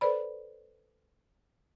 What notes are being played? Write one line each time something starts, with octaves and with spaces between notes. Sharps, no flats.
A4 B4 C5 D5 B5